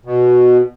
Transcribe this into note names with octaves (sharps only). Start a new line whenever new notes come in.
B2